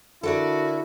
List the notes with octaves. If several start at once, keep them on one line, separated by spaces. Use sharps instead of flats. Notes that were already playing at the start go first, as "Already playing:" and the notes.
D3 E4 F#4 A4 A#4 D5